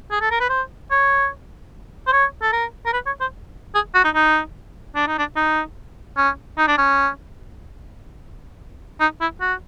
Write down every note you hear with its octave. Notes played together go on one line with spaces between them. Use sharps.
G#4
A4
A#4
B4
C5
C#5
C5
C#5
A4
A#4
A#4
B4
C#5
C5
G#4
F#4
D#4
D#4
D4
D#4
D4
D#4
C#4
D#4
D4
C#4
D#4
E4
F#4